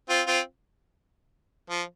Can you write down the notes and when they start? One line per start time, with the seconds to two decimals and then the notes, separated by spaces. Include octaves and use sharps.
0.09 C4 F4
0.27 C4 F4
1.70 F3